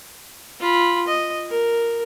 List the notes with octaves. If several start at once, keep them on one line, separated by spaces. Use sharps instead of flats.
F4 B5
D#5
A#4